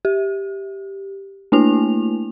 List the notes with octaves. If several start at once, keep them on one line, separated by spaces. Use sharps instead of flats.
G4
A3 A#3 D4 E4 F7